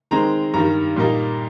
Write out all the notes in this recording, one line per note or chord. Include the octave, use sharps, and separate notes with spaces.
D#3 G#3 C4 A#5
G2 D#3 G3 A#5
A#2 G3 A#3 D#4